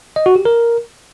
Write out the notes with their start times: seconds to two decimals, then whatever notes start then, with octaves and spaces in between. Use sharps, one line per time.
0.16 D#5
0.26 F#4
0.36 G4
0.45 A#4